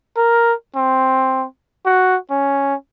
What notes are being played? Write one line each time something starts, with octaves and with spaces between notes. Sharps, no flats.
A#4
C4
F#4
C#4